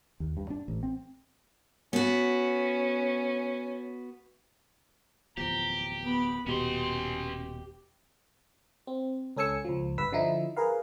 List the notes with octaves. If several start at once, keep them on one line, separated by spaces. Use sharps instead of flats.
D#2
G2
D4
A1
C4
B3 C#4 F#4
D1 E2 F3 G4 A#5
B3 B5
D#1 B2 C#4 G4 C6
C4
C#2 C#4 A4 G#5 E6 C#7
C#2 F3
G1 G2 B4 E6 B6
D3 F3 D#4 E4
G#4 A#4 B4 F5